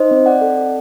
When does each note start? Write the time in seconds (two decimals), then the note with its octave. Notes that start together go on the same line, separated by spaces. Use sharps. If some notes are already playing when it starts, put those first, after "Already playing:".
Already playing: D#4 C5 D#5
0.11 C4
0.26 D5 F#5
0.41 A4